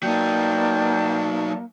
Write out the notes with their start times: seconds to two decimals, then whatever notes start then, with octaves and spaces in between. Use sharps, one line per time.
0.03 F#3 A#3 D#4 D5 G5 A5